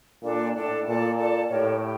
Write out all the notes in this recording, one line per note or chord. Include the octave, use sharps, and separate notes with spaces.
A#2 D4 A4 D5
A2 D4 A4 D5
A#2 A4 D5 A5
A4 D5 A5
A2 G4 A#4 C#5
G4